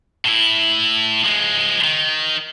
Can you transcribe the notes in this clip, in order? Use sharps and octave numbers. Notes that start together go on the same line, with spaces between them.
A2 E4
F3 G#3
D#3